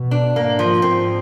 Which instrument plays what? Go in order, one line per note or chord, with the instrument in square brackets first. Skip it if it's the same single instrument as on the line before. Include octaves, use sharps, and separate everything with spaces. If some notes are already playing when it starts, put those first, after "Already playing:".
Already playing: [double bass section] B2
[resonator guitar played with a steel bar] D4
[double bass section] G#2 [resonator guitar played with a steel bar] A#3
[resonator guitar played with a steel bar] F3
[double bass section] G#2 [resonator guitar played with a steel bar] C4